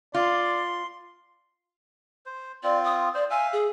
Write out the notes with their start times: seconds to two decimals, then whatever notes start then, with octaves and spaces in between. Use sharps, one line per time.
0.14 F4 D5 C6
2.26 C5
2.63 C4 F4 D5
2.84 D#6
3.14 C5 D5
3.30 E5 F5 G#5
3.53 G#4